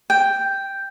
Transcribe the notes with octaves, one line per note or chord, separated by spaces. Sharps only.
G5